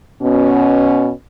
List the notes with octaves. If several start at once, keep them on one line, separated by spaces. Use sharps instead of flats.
B2 C#4